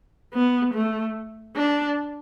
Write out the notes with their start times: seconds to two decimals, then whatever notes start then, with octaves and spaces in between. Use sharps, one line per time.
0.34 B3
0.74 A3
1.56 D4